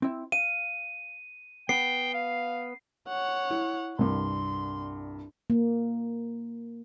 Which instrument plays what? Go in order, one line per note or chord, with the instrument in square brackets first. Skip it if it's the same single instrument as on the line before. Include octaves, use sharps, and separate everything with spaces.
[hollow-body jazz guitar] C4 E4
[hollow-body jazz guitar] F5 [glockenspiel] D#7
[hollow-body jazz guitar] B3 [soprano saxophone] G5 [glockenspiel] C7
[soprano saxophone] F5
[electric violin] C#5 F#5
[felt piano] E4
[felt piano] C2 G2 [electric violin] C6
[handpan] A#3